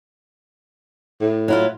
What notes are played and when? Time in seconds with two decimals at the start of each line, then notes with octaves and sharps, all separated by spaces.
1.21 A2
1.48 F#3 E4 F4